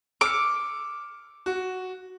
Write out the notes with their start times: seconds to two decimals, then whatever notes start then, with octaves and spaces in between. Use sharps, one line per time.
0.21 D6 E6 F6 C#7
1.46 F#4